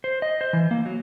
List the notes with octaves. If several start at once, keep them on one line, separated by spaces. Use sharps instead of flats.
C5
D#5
C5
E3
A#3
F#3